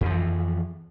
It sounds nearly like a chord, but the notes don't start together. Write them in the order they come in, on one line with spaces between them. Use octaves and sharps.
F2 F3 E3